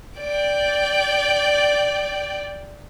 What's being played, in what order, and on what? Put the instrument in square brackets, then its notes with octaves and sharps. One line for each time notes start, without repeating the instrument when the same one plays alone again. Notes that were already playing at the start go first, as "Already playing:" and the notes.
[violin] D5 G5